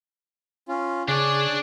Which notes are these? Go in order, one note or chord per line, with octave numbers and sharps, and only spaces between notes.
C#4 F4
C#3 D4 G#4 C#5 D5 G#5